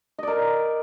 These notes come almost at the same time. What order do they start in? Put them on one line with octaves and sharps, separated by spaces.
D#5 D5 A#4